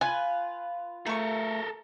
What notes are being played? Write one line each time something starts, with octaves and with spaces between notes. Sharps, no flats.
F4 B4 G#5
A3 A4 A#4 C#6